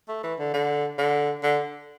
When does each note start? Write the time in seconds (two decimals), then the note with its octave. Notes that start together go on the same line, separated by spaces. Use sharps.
0.08 A3
0.23 E3
0.39 D3
0.54 D3
0.98 D3
1.43 D3